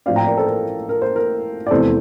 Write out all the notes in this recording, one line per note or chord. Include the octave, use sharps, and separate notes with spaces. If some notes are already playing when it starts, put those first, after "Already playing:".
A1 A2 F3 C4 D5 F5
G5 A#5
A#4 D5
A4 C5
A#4
A#4
C5
A#4
D5
F1 E2 C3 E3 A4 C5